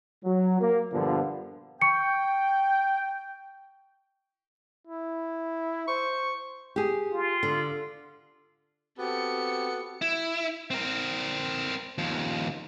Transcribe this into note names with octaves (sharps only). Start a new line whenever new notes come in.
F#3
A#3
G2 A#2 D3 F3 B3
G5 C#6 C#7
E4
C5 C#6
G4 G#4
F4
D3
B3 C4 F#4 G4 A4 C#7
E4
C4 A#4
D#2 F3